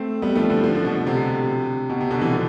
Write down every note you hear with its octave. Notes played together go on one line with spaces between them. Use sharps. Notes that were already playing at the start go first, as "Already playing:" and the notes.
Already playing: A3 C4
G3 B3
F3 A3
D3 F3
D3 F3
D3 F3
B2 D3
C3
B2
C3
B2 D3
C3 E3
D3 F3